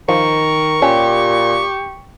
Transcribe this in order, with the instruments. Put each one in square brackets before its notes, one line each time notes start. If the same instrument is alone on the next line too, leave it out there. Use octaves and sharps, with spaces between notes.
[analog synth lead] D#3 [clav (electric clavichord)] F3 [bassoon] A#4 [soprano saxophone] C#6
[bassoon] A#2 [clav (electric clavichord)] C#4 [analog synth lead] G4